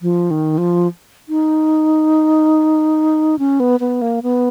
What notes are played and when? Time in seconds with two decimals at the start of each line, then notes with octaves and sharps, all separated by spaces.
0.02 F3
0.31 D#3
0.58 F3
1.29 D#4
3.39 C#4
3.60 B3
3.80 B3
4.02 A#3
4.23 B3